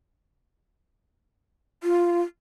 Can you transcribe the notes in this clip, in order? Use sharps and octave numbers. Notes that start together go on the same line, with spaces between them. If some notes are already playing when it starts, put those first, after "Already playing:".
F4